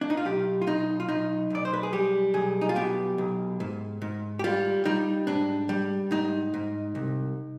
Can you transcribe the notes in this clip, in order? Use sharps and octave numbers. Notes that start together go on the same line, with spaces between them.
D4
D#4
F4
B1 G4
F4
B1 D#4
F4
B1 D#4
B1 D5
C5
B4
G#4
G3 G4
B1 G#4
D#4
F4
B2 G4
B1
G#2
G#2
G4
G3 F4
G3 D#4
G#2 D4
G3
G#2 D#4
G#2
C2